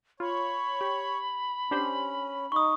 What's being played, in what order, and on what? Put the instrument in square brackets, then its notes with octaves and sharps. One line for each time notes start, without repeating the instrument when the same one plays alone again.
[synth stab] F4 [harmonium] C#5 [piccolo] B5
[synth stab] G4
[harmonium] C#4 [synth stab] D4 G4 C5
[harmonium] D#4 [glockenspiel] C#6 D#6